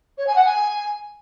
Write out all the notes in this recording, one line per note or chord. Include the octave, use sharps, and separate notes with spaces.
C#5
G#5
F#5
G#5